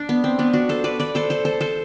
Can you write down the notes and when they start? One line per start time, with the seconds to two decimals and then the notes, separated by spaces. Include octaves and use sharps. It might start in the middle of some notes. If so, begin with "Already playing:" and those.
Already playing: D4
0.09 B3
0.24 C4
0.39 B3 D4
0.53 D4 F#4
0.69 A4 C5
0.84 B4 D5
1.00 B4 D5
1.15 A4 C5
1.30 A4 C5
1.45 A4 C5
1.61 A4 C5